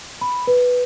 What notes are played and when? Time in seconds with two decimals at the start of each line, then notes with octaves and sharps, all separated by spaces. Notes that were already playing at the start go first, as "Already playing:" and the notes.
0.21 B5
0.47 B4